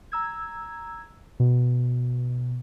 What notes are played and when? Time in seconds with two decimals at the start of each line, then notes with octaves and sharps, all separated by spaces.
0.12 A#5 E6 G#6
1.40 B2